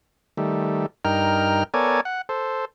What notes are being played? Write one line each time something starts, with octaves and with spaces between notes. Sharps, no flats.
D#3 G3 A3
G2 D#4 A#4 G5 F6
B3 A4 A#4 C#5 D5 G#5
F#5
A4 C5